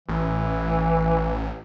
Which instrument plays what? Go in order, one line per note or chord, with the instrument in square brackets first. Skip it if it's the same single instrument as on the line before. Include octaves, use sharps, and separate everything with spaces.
[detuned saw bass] A1 [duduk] E3